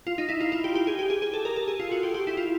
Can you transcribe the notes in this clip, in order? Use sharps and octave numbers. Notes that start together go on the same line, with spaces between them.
F4
D#4
E4
F4
F4
G4
G4
G#4
G4
G#4
G#4
A4
A#4
A4
G#4
F4
F#4
G4
G4
E4
F4